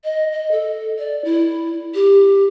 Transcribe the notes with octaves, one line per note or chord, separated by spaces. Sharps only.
D#5
D#5
A4
D5
E4
G4